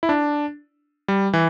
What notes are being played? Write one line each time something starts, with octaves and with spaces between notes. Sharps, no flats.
E4
D4
G3
E3